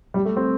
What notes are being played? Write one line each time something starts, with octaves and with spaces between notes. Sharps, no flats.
G3
A3
C4